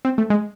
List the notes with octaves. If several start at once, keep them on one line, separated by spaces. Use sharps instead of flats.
C4
A3
G#3